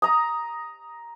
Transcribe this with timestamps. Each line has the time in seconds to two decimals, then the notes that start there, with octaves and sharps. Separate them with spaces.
0.02 A#5 D#6